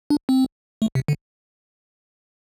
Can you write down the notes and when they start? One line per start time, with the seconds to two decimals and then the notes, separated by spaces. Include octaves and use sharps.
0.10 D4
0.29 C4
0.82 A3
0.95 C3
1.08 D3